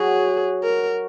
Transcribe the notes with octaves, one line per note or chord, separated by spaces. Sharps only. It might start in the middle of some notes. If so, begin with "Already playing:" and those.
Already playing: F#3 F#4 G#4
A#4